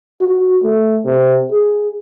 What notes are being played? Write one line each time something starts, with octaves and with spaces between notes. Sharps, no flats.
F#4
A3
C3
G#4